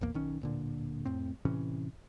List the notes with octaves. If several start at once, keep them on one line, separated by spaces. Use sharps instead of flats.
A#1 E2 A#3
B1 D#3 C#4
D1 A#2 D3
F2 A2 C4
A2 C3 E3 C#4